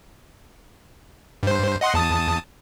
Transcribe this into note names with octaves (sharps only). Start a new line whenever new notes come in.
G2 C5
D#5 F#5 C6
E2 A5 D#6